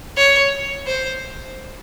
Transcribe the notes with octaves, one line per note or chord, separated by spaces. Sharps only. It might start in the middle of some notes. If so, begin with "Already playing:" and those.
C#5
C5